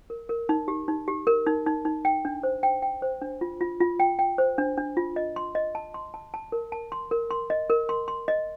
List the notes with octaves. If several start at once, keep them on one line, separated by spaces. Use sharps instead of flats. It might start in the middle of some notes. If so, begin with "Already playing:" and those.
A#4
A#4
D#4
G4
D#4
G4
A#4
D#4
D#4
D#4
G5
D4
C5
G5
G5
C5
D4
F4
F4
F4
G5
G5
C5
D4
D4
F4
D#5
C6
D#5
A5
C6
A5
A5
A#4
A5
C6
A#4
C6
D#5
A#4
C6
C6
D#5